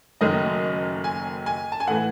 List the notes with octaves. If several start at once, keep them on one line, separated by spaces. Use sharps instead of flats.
F#1 F#2 D#3 F#3 A3 D#5
G#5
G#5
A5
G#5
A2 E3 A3 F#5